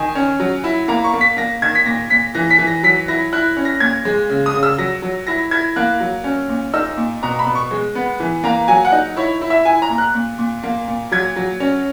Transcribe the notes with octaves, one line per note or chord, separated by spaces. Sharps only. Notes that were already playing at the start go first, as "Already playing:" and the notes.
Already playing: D#3 G#5
C#4
F#3
E4
A#3 A#5
C#6
A#3
B6
A#3 A#6
D#3 G#6
B6
A#2 A#6
A#2 B6
E3 A#6
B6
E3
A#6
F#3 B6
E4 A#6
E4 F#6
C#4
A#6
A#2 G#6
G#3
C#3
D#6
C#3
E6
F#3 A#6
F#3
E4 A#6
E4 G#6
A#3 F#6
F#3
C#4
A#2
D#4 E6
A#2
B2 A#5
B5
B2
C#6
G#3
B3
E3
A#3 A#5
F#3 G#5
F#5
D#4
E4 C#5
E4
E5
E4 G#5
A#5
A#2
F#6
A#2
A#2
A#3
A#2
F#3 G#6
F#3
C#4